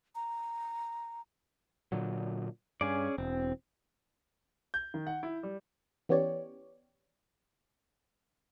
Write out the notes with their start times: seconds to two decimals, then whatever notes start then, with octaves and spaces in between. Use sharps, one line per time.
0.15 A#5
1.92 A#2 D3 F#3
2.81 G2 C#4 G#4 D5
3.18 E1 C4
4.74 G6
4.94 D#3
5.07 F#5
5.23 E4
5.43 G3
6.09 E3 B3 C#4 G4 C#5 D5